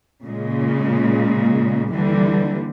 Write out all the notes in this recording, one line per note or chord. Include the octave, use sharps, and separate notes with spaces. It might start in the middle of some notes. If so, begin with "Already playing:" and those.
A#2 C#3 G#3
D#2 D3 E3 G3